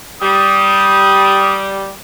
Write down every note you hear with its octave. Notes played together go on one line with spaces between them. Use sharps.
G3 D#6